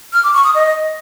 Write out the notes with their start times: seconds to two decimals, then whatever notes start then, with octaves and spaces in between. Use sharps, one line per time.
0.13 F6
0.23 D6
0.34 C#6
0.44 D#6
0.54 D#5